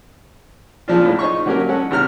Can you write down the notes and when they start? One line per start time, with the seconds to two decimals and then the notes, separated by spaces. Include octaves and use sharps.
0.88 A#2 C#3 F3 D4 F4
1.04 F2 A2 C#3
1.19 D#4 C5 C#5 C#6
1.46 D3 F#3 A#3 C#4 G4 A#4
1.68 G#3 C#4 A4 F#5
1.91 G#1 C3 A#5 F6